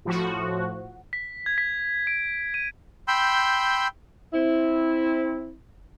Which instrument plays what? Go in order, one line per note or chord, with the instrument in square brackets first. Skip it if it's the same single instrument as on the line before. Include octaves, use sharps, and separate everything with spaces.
[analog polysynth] A2 F3 F#4
[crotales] B6
G#6
B6
D7
D#7
[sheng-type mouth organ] G5 B5 C6 E6 G6
[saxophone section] C4 E4